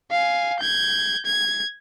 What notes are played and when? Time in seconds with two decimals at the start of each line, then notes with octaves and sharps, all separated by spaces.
0.11 F5 G#5
0.60 G6 G#6
1.25 G#6